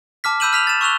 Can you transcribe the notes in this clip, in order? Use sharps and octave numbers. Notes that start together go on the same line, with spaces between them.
A5 D6 F6 B6
B5 E6 G6 D#7 E7 F#7
F6 B6 F7 F#7
A6 E7
C#6 E6 F#6 F7 G7